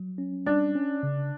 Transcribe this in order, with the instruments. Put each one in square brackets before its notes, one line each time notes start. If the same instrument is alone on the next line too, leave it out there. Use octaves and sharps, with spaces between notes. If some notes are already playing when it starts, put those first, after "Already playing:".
Already playing: [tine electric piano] F#3
C#4
[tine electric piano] G3 [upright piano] D4
[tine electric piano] C#4
C#3